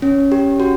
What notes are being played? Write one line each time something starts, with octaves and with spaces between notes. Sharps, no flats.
C#4
G4
F#4